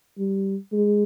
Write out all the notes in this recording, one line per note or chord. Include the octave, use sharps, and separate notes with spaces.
G3
G#3